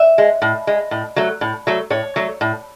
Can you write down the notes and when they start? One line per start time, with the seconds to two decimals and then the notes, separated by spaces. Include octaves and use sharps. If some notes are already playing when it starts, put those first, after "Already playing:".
Already playing: E5
0.18 G#3
0.42 A2
0.67 G#3
0.91 A2
1.16 F#3 A3
1.41 A2
1.67 F#3 A3
1.90 A2 C#5
2.16 F#3 A3
2.41 A2